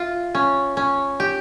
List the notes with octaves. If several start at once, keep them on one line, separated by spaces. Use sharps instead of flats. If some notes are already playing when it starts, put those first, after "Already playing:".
Already playing: F4 E5
C#4
C#4
G4